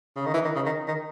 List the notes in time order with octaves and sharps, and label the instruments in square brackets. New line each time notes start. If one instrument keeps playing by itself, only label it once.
[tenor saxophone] C#3
D#3
E3
D#3
C#3
D#3
D#3